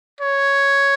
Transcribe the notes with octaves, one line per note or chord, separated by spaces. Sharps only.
C#5